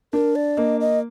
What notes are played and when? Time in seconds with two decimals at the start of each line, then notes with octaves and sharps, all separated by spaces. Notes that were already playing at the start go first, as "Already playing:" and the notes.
0.13 D4 A#4
0.35 D5
0.57 A#3 D#5
0.80 D#5